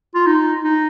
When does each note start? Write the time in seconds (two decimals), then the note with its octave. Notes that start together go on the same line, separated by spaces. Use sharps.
0.15 F4
0.27 D#4
0.64 D#4